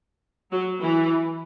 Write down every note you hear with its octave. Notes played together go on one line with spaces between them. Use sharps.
F#3
E3